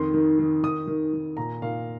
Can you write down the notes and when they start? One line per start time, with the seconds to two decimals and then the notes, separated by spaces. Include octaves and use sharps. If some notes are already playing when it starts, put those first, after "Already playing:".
Already playing: F2 D#3 C6
0.14 D#3
0.39 D#3
0.63 D#3 D#6
0.87 D#3
1.13 D#3
1.37 A#2 A#5
1.62 A#2 F5